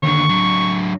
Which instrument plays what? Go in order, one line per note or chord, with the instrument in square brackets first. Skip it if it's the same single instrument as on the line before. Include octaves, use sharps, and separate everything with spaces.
[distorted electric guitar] D#2 D3 [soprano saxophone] C#6
[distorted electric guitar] F#3 D4